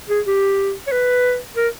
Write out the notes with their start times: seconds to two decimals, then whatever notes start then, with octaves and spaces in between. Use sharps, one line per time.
0.09 G#4
0.27 G4
0.87 C#5
0.92 B4
1.56 A#4